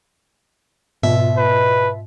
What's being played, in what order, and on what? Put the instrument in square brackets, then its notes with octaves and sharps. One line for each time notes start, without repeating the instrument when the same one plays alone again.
[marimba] G#2 [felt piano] B2 [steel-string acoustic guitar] F4 E5
[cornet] B4